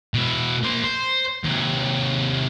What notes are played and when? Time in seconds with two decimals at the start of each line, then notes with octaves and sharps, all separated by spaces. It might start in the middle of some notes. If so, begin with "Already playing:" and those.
0.14 B2 E4
0.63 A#3 C5
0.84 C5
1.44 D#2 C3